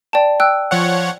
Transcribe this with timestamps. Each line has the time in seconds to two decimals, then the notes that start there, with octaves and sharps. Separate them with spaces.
0.13 D5 G5 A5
0.40 G5 E6 F#6
0.71 F3 C#5 F#5